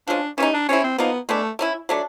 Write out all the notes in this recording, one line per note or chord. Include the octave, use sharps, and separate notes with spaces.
F3 G#3 C#4 D4
E3 G3 B3 C#4 D#4
D4
G3 C4 C#4 E4
C4
F3 A#3 B3 D#4
G#3 A3 B3 D4
A3 C#4 E4
F#3 A3 D4